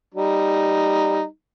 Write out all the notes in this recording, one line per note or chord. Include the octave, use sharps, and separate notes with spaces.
G3 D#4